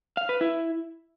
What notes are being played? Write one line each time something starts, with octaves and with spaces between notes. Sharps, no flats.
F5
B4
E4